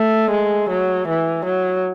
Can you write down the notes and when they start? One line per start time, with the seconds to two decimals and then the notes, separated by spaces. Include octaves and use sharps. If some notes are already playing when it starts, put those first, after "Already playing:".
Already playing: A3
0.31 G#3
0.70 F#3
1.08 E3
1.45 F#3